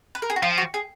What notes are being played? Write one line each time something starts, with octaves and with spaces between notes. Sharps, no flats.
B4
A#4
G#4
F#4
F3 F4
F#4
G#4